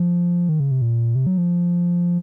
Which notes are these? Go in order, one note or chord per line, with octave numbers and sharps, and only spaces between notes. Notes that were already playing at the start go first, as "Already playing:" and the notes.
Already playing: F3
D#3
C#3
C3
A#2
C3
F#3
F3